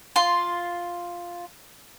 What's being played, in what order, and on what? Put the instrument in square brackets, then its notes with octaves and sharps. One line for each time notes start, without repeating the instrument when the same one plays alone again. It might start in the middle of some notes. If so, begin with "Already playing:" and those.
[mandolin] F4 C6